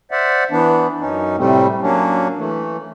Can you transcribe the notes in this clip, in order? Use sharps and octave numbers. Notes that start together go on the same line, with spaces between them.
C5 D5 E5 F#5
E3 B3 D4
F#2 C#4 D#4
A2 C3 G3 A3 C4
F#3 A#3 C#4 D4
E3 A3